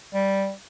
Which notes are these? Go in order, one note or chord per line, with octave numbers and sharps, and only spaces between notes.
G3